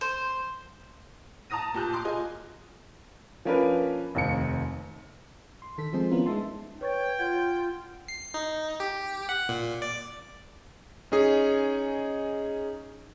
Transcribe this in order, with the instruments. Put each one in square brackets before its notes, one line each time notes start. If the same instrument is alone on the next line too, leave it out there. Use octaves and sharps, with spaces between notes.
[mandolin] C5
[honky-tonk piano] A5 A#5 D#6 A#6 D#7
A#2 G4 A5 F#6 G6
A#5 C6 D6
F4 G#4 D#5 G#5
[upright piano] F3 A#3 C#4 D4 A#4 B4
F1 D#2 C#7
[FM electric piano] C6
D#3 A4 B6
F3 G#3 C4 G#4 A4 C5
B3 C#4 E4 F4 A#4
G#3 D#4 E5 A5 C6
[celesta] B4 C#6 A6 [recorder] C#5 [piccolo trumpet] G5
[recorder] F4 [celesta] F#5 G6 G#6
[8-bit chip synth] C7
D#4
G4
F#5
A#2
D5
[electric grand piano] C#4 D#4 G#4